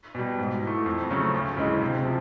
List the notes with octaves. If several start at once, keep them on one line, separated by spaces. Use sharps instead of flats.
B2 G3
G#2
E3 A3
F2
C#3 F#3 A3 C#4
D2
C#3 E3 G#3
C3
F3